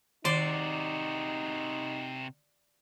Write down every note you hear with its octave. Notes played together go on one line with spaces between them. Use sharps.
C3 D#3 D#4 F#4 D5 C6